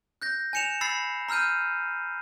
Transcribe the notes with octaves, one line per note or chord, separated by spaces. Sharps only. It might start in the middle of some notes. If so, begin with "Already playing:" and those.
F#6 G6 A#6
G#5 F#6 C#7 E7 F7
B5 E6 A6 C7
A#5 E6 F6 G6 D#7